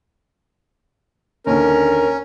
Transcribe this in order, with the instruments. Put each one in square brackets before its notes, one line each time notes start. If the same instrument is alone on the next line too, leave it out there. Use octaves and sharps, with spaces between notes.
[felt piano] D#2 D3 [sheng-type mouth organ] C#4 [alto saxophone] A#4